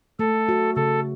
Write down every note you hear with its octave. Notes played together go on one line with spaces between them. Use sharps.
A3 A4
F#4
C#3 A4